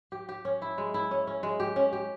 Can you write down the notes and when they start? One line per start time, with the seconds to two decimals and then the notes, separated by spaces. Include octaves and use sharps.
0.12 G4
0.29 G4
0.45 C#4
0.62 E4
0.78 G#3
0.94 E4
1.11 C#4
1.27 C#4
1.43 G#3
1.60 G4
1.76 C#4
1.93 G4